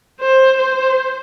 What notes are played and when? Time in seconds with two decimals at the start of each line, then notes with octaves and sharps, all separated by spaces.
0.20 C5
0.58 C5